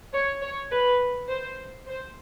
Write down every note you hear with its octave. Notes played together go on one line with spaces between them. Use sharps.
C#5
C#5
B4
C5
C5